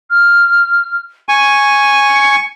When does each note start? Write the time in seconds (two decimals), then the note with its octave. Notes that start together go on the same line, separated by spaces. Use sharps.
0.10 F6
1.29 G#5 C#6 D#7
2.08 C#7